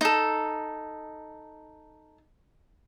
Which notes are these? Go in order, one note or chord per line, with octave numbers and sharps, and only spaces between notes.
D#4 A4